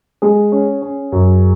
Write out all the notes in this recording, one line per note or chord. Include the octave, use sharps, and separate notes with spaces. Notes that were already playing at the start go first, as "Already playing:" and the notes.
G#3 G#4
C#4
C#4
F#2